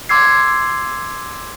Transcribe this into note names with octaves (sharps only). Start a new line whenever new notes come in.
C6 D6 E6 G#6 C7